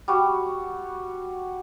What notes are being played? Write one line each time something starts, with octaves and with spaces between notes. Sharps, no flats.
G3 F#4